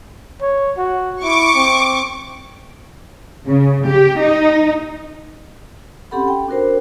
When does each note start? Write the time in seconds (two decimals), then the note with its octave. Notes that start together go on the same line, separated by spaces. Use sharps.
0.41 C#5
0.77 F#4
1.23 E4 C#6 D6
1.55 C4
3.46 C#3
3.87 G4
4.21 D#4
6.11 C4 C#4 G4 A4 F#5 B5
6.28 G5
6.48 D4 F#4 A#4 C5